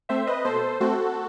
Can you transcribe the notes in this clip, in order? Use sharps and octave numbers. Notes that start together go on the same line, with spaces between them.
A3 C4 C5 E5
B4 D#5
B2 A4 C5
A3 C4 F#4 A4